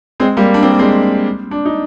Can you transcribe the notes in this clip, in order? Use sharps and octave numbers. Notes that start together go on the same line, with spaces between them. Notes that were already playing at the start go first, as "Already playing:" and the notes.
G#3 C4
G3 A#3
D4
C4
A#3
G#3 C4
D4
D#4